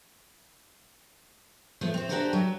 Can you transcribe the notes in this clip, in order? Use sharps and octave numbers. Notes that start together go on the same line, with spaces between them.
F3 A3 B3 C5
C4 C5
D4 F#4 G4 A4 A#4 C5
F#3